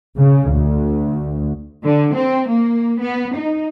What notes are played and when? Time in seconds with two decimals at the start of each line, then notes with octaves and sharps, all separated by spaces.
0.17 C#3
0.51 D2
1.84 D3
2.14 C4
2.48 A#3
3.01 B3
3.36 D#4